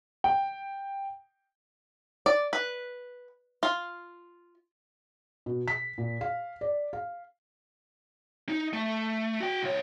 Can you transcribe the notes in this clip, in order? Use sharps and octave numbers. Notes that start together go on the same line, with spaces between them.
G5
D5
B4
F4
B2
B6
A#2
F5
D5
F5
D#4
A3
F#4 G5
C2 C#5